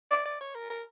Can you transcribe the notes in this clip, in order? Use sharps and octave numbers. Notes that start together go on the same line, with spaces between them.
D5
D5
C#5
A#4
A#4